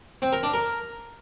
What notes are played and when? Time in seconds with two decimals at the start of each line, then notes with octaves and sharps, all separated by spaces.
0.22 C4
0.33 A#4
0.43 D4
0.54 A#4